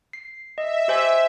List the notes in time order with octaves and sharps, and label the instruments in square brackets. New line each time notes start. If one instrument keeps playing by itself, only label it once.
[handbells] C7
[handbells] D#5 [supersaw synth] E5
[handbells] G4 C5 G#5